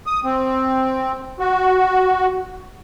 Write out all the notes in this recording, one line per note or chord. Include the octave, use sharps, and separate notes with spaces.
D#6
C4
F#4